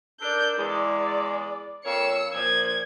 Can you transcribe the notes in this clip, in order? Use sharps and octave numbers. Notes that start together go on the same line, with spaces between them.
D4 A4 A#4 D5 G6
E2 G#3 D5
F2 A#3 C#5 E6 C#7
A#2 F3 G#6